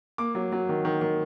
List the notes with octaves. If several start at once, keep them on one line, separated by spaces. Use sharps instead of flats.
A#3 D6
F#3
F#3
D#3
D#3
D#3